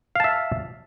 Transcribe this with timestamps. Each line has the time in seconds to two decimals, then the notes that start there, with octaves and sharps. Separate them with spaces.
0.15 F5
0.20 A5
0.24 E5